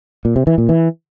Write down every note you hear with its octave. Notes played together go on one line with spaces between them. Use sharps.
A#2
C3
E3
A#2
E3